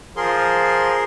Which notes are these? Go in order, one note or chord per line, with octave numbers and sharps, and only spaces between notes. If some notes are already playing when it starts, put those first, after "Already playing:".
F3 G#4 A#4 C6